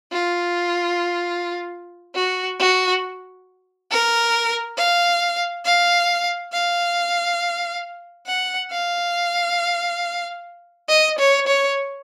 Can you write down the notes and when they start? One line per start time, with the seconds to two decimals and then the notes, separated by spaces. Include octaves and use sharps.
0.12 F4
2.15 F#4
2.59 F#4
3.91 A#4
4.78 F5
5.65 F5
6.53 F5
8.26 F#5
8.70 F5
10.88 D#5
11.19 C#5
11.47 C#5